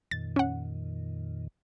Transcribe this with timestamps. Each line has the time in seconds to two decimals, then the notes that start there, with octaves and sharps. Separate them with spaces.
0.11 F2 A#2 D#3 A6
0.36 C#4 F#5